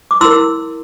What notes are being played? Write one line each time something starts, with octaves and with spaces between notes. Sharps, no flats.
D6
E4 A#4 C6 E6